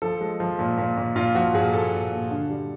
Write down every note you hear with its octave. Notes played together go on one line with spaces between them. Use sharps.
F3 A4
G#3
F3
A#2
A#2
A#2
A#2 F4
F3 F#4
A#2 G#4
A#2 A4
A#2
A#2
D3
G3